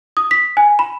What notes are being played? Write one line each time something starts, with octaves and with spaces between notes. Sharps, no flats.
D#6
B6
G#5
B5